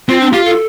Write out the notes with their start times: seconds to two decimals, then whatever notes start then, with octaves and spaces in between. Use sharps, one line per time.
0.09 C4 F4
0.21 D4
0.32 F4 G4
0.45 A4